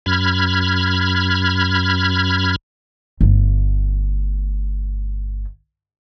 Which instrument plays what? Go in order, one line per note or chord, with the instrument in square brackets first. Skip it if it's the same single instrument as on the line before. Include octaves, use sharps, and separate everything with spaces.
[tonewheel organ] F#2 B5 F6 G#6
[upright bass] G1 A3